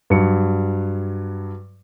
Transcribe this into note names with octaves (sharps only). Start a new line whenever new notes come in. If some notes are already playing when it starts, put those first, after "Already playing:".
G2 F#3 C#7